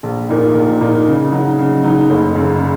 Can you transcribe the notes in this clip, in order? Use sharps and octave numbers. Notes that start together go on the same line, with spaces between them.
A#1
A#2 A#3 D#4
A#1
A#2 A#3 D#4
C#3
F#3 D#4
C#3
F#3 D#4
F#1
F#2 C#3